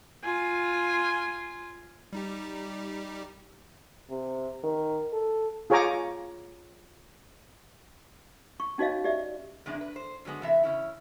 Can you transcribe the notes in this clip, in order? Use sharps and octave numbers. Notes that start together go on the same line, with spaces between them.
F4 G#5
G3 D#4 G4
C3
D#3
A4
F4 G#4 C#5 G#5 A#5 D6
C#6
C#4 D#4 F#4 C#5 D#5 F5
G4 D5 E5
E2 C3 G#3 D4 G#4
B4
C5
D3 F#3 G#3 B3
C3 E3 E5
C#3 C#4 E4